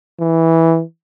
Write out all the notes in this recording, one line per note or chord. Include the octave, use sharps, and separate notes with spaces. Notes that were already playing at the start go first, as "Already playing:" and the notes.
E3